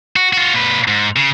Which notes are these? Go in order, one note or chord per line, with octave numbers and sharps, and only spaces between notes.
F#4
F4 F#4
A#2 B4
G#2
C#3